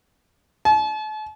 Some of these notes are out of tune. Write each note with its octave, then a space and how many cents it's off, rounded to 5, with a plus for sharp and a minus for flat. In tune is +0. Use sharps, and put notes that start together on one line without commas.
A5 -40